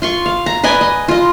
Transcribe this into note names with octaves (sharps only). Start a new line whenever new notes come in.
F4 C6 C#6
F5
A#5
B4 D5 D#5 G#5
D#5
F4 D#5